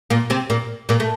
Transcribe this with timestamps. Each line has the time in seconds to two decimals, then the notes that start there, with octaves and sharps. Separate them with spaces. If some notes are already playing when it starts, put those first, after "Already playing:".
0.10 A#2 A#3
0.30 C3 C4
0.50 A#2 A#3
0.89 A#2 A#3
1.00 A3